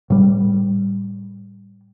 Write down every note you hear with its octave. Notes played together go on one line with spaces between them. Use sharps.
A2 G3